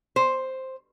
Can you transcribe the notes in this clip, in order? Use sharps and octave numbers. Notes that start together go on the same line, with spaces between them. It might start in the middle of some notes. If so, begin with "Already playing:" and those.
C5